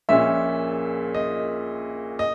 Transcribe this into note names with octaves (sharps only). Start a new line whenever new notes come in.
A#1 A#2 G#3 C#4 E5
D#5
D#5